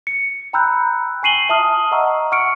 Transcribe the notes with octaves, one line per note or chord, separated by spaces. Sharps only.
C#7
G5 A#5 B5 E6 F#6 G6
G#5 C#6 C7 D#7 F#7 G7
E5 A5 D#6 F6
D#5 F#5 A#5 C#6 E6
F#5 C#6 F6 C#7 D7